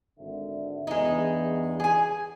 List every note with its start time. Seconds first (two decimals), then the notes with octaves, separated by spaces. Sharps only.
0.19 G#1 D3 E5
0.87 E2 G2 G#3 D#4
1.80 G#4 G#5